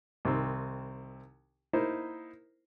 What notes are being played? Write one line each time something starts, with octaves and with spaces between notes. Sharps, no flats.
C2 D#3 C4
A#3 D#4 E4 C5